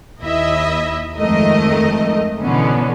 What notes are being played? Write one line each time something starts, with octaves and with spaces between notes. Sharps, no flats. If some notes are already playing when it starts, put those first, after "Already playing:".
D#2 E4 D#5 E5
F2 G#2 D#3 A3 A#4 D#5
B2 D3 E3 B3 C#4